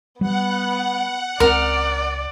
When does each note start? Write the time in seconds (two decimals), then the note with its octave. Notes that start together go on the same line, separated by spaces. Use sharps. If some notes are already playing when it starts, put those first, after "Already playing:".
0.21 G3 B3 F#5
1.40 C#2 C4 A#4 D5